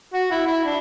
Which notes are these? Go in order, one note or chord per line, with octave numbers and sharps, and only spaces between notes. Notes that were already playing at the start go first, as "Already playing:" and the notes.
F#4
E4
E4
D4